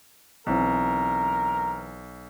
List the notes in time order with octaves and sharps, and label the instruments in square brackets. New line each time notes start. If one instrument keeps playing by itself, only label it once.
[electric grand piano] B1 [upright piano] E3 C4 [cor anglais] A#4